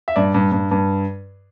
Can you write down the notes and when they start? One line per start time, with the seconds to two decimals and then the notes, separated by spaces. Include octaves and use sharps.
0.08 E5
0.16 G2 D5
0.34 G2
0.52 G2
0.71 G2